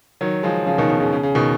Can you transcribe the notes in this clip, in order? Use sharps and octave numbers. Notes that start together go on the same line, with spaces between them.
D#3 F#3
F3 G#3
C#3 F3
B2 D#3
B2
C#3
C#3
C#3
B2 D#3